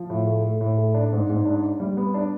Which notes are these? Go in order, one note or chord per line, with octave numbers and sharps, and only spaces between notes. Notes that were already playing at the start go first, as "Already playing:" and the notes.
Already playing: F3
A2
A3
A3
A2
A3
D4
G#2
G#2
D4
D4
G3
B3
D4